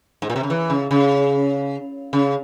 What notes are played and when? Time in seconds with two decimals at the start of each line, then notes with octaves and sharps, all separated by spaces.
0.22 G#2
0.30 A#2
0.36 C3
0.43 C#3
0.50 E3
0.70 C#3
0.91 C#3
2.13 C#3